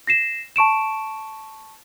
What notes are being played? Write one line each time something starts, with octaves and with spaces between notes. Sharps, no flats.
A#6 C7 E7
A5 C#6 D7 E7